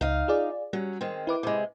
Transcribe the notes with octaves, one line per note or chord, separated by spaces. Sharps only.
C#2 D#4 F5
F4 G#4 D5
F#3 G3 C#4
D#3 G#3 C4
E4 B4 D6
C3 G#3